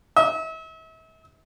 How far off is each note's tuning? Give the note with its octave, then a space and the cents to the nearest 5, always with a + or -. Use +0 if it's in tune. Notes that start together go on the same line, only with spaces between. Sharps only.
E5 -40